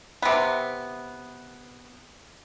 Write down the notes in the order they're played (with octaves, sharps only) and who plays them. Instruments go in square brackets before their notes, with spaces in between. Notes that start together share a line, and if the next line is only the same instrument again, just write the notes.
[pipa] C3 B3